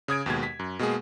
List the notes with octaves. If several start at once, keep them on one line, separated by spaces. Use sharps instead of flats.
C#3 D#6 G#6 D7
D#2 B2 G#3 G#6
B6
F#2
B2 G#3 A#3 G#4